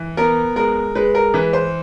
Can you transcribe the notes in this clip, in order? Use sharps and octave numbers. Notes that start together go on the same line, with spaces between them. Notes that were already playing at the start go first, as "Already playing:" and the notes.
Already playing: E3
B3 A#4
G#3 A#4
G#3 B4
A#4
E3 B4
C5